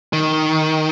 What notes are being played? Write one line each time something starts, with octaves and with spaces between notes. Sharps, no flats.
D#3